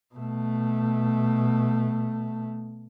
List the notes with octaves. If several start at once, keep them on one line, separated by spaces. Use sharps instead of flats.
B2 A3